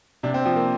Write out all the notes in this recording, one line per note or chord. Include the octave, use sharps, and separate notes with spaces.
C3 D4
C4
F3 C4
A#3